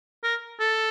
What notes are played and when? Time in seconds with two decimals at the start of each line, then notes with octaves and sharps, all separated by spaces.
0.24 A#4
0.60 A4